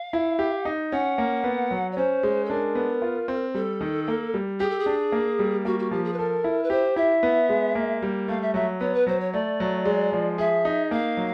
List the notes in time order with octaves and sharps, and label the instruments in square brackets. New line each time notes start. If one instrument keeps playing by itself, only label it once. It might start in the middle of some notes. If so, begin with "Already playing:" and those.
Already playing: [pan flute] F5
[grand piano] E4
G4
D#4
[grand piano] C#4 [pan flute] F#5
[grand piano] A#3
B3
F#3
[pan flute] C#5
[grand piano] C#4 [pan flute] C5
[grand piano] G#3
[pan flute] A4
[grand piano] D4 [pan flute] A#4
[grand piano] B3
F4
C4
[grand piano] G3 [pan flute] A4
[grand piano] D#3
A#3
G3
[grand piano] G4 [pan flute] G#4
[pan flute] A4
G#4
[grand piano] D4
A#3
G3
[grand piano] A#3 [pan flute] F#4
[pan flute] F#4
[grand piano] F3 [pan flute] G4
[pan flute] G#4
B4
[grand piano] A4 [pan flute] A#4
[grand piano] E4
[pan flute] B4
[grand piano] G4 [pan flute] C5
[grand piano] E4 [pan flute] E5
[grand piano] B3
G#3
A#3
G3
[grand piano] A3 [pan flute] F5
[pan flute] E5
[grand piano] F#3 [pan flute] E5
[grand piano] B3 [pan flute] C#5
[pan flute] B4
[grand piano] F#3 [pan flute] C5
[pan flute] C#5
[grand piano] A3 [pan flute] D5
[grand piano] F#3
G#3
F3
[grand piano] G#4 [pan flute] E5
[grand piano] D#4
[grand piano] A#3 [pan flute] F5
[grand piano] F#3